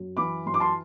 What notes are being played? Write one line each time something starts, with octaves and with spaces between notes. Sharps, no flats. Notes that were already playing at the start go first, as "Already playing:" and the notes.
Already playing: F#2
E3 B5 D6
F#2 C6
D6
A5 C6